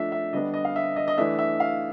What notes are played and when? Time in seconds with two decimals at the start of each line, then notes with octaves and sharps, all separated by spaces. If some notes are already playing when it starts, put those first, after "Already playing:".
Already playing: F3 A3 D4 E5
0.12 E5
0.33 D3 G3 B3 D4 D#5
0.54 D#5
0.65 F5
0.76 E5
0.96 D#5
1.08 D#5
1.17 E3 A3 D4 E5
1.39 E5
1.60 F5